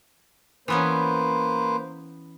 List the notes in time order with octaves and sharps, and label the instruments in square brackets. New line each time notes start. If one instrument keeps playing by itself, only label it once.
[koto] E3 B3 C#4 [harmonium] A#3 B4 C5